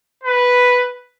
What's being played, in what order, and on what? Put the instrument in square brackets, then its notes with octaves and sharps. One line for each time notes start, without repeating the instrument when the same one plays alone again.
[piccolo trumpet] B4